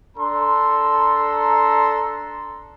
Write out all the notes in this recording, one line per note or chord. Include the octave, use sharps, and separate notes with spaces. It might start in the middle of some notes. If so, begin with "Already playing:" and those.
D4 A4 A#5 C6